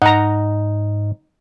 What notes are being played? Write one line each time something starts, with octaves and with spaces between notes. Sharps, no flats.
G#2 D#4 F#5 A#5